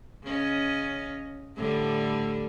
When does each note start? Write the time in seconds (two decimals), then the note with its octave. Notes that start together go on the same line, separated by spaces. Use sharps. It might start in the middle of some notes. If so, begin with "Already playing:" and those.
0.24 C#3 C#4 D#5
1.56 A2 D3 G3